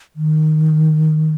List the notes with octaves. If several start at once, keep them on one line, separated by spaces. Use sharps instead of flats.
D#3